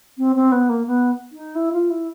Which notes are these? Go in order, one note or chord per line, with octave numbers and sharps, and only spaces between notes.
C4
C4
B3
A#3
B3
D#4
E4
F4
E4